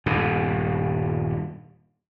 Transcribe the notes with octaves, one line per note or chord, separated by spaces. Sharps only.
D#1 G2 B2